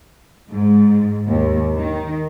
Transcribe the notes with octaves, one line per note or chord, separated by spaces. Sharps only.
G#2
D#2
D#3